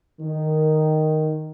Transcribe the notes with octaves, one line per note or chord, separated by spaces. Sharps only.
D#3